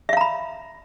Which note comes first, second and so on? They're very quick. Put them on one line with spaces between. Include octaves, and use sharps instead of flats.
E5 F5 A#5 B5